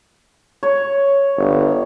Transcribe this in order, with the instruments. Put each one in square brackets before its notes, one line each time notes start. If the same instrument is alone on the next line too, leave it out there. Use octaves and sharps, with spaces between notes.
[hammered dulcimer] C#5
[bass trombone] G1